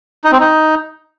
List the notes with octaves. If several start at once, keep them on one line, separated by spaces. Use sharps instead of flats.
D#4
C4
D#4